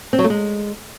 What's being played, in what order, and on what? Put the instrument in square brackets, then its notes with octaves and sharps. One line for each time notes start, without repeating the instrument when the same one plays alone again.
[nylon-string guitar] C4
F#3
A3
G#3